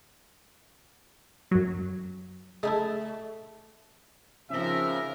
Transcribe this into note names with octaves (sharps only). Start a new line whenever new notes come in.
F#2 F#3
G#3 A3 D#4 E4
C#3 F3 C4 C#4 D#4 A#4 E5